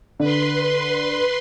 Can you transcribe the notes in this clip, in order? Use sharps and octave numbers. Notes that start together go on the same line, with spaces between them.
D3 B4 C6